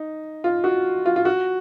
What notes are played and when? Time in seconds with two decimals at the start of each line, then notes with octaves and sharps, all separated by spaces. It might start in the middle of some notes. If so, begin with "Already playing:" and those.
Already playing: D#4
0.44 F4
0.64 F#4
1.06 F4
1.16 F4
1.25 F#4